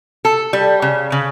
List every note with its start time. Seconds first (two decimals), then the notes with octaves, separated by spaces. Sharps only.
0.25 A4
0.53 G3
0.82 C#3
1.12 C#3